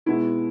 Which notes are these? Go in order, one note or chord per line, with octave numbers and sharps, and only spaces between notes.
B2 G#3 B3 E4